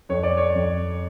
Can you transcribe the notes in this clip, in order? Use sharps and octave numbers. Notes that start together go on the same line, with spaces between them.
F2 C#5
D5
C#5
F2